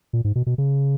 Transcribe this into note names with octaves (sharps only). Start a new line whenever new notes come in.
A#2
G#2
B2
B2
C#3